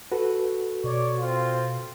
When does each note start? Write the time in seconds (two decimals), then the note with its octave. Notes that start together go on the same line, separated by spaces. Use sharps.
0.12 F#4 A4 B4
0.84 B2 C#5 D5 C#6
1.19 C4 F4 C5